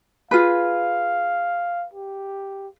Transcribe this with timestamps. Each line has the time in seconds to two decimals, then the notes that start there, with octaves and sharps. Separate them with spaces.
0.31 F4 G#4 B4 F5
1.94 G4